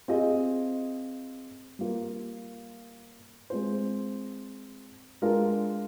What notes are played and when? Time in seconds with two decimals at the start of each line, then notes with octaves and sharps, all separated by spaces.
0.08 C4 F4 G#4 D#5
1.79 G3 A#3 F4
3.50 G#3 C4 F4 C5
5.22 G#3 D4 F4 A#4